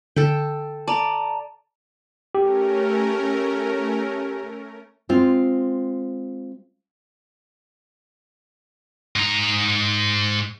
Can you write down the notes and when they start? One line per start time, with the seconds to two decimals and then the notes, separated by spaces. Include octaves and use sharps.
0.16 D3 A4 G5
0.88 D5 A5 A#5
2.35 A3 C#4 G4 A#4
5.09 G#3 C4 F4
9.16 G#2 A#5